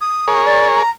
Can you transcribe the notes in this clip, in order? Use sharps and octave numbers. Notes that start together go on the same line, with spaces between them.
D#6
G#4 A#4 C#5
D5
A#5